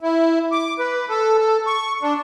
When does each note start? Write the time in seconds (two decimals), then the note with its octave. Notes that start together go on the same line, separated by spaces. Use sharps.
0.01 E4
0.52 D6
0.79 B4
1.09 A4
1.39 A4
1.67 C#6
2.02 D4